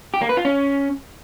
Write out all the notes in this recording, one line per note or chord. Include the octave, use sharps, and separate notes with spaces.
G4
A#3
B4
F4
C#4